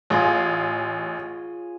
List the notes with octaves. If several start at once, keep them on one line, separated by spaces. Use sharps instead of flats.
A1 F4 G#4 C#5